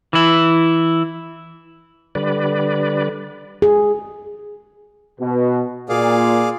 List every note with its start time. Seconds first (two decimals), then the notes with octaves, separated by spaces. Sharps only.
0.13 E3 E4
2.15 D3 G3 B4 D5
3.62 G#4
5.20 B2
5.89 A#2 G#4 D5 F5